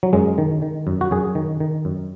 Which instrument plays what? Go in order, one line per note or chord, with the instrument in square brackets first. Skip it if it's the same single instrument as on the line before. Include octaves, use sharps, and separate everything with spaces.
[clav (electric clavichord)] F#3
F#2 G#3
D#3
D#3
F#2
F#4
F#2 G#4
D#3
D#3
F#2